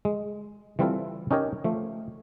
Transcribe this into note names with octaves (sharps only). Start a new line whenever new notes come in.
G#3
E3 G3 C4 E4 F4 A4
C#4 D#4 G4 A#4 C#5
F3 A3